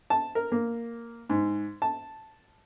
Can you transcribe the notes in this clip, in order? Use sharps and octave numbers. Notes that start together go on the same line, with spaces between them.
A5
A#4
A#3
G#2
A5